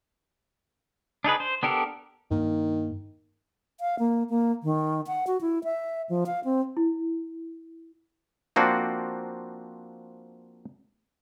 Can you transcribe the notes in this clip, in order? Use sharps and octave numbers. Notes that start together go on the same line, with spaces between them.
D4 D#4 G#4 B4
C5
B3 D4 G4 A4 A#4
G2 D#3 A#3
F5
A#3
A#3
D#3
F#5
F#4
E4
E5
F3
F5
C4
E4
F3 A#3 C4 D4 F#4